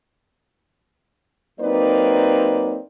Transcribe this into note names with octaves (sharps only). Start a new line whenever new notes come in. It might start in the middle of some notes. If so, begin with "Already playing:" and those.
F#3 A#3 C4 D#4 B4 D5